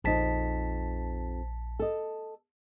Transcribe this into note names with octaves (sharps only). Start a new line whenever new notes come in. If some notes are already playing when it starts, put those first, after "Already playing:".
A#1 F2 D#4 A5 B6
A4 D#5